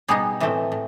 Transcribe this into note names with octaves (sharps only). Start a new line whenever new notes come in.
B2 G3 B3 D#4 G#4
A2 E3 A3 C4
A2